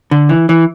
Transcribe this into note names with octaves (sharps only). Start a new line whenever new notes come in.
D3
E3
E3